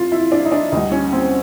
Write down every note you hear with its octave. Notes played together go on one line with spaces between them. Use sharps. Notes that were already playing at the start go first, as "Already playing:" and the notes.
Already playing: F2 C3 F4
E4
D4
D#4
D4
D2 D3 G3 D#4
C#4
C4